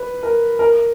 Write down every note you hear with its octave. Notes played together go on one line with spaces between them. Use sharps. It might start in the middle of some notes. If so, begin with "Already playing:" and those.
Already playing: B4
A#4
A#4